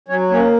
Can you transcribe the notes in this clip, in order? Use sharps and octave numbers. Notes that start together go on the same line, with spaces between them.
F#3 C#4 C#5
A#3 C#4 C#5